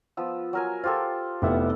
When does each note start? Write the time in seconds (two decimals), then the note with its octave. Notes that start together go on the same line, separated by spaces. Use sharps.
0.17 F3 B3 E6
0.53 F#3 A#4 G#5
0.84 F4 G4 A4 C5
1.42 F1 B3 E4 G4 E5 F#5